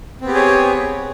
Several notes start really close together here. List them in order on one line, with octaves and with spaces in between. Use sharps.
C4 B3 G4 G#4 C#5